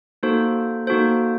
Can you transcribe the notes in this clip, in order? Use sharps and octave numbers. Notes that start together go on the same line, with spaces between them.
A#3 D#4 F#4 A4 C5
A#3 D#4 F#4 A4 C5